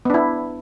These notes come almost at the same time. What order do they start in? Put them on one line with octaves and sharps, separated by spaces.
B3 D4 E4